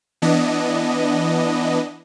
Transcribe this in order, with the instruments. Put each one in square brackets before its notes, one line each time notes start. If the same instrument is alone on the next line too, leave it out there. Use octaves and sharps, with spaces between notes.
[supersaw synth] E3 B3 D4 D#5